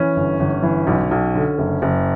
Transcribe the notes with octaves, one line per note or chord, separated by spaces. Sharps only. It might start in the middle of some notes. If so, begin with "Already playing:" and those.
Already playing: E3 C#4
G1
G1
E3
B1
B1
D3
F#1
F#1